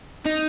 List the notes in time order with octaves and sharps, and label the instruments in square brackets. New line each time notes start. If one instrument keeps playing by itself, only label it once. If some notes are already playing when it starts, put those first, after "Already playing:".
[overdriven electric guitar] D#4